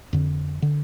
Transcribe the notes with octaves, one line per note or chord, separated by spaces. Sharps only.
F2 D3
D3